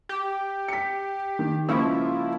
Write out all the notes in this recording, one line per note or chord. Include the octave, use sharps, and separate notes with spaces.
G4
B6 C#7
D#3
C#2 F3 A#3 E4 C#6